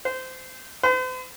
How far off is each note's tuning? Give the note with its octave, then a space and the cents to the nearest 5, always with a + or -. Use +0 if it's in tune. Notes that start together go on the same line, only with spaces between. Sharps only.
C5 -20
C5 -45